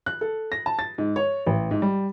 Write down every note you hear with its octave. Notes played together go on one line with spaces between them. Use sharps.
F#6
A4
A#6
A5
A6
G#2
C#5
A1
G#2
G3